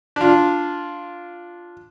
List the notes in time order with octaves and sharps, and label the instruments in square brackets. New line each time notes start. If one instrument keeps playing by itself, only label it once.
[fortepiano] D4 F4